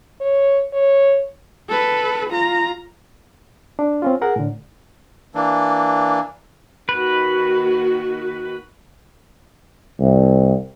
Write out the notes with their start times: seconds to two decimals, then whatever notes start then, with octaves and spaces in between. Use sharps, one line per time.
0.20 C#5
0.73 C#5
1.69 A4 B4
2.30 F4 A#5
3.79 D4
4.02 C4 C#4 F4
4.21 G#4 A#4 F#5
4.36 A2 D3
5.35 E3 A#3 D4
6.89 D#3 A#3 F#4 B4
10.00 C2